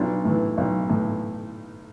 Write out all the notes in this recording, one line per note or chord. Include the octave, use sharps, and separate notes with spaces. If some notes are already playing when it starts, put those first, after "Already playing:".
Already playing: B1 D4 F4
A2 E3
B1
A2 E3